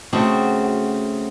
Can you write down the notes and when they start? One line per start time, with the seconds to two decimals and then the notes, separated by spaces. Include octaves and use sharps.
0.13 C#3 A3 C4 F#4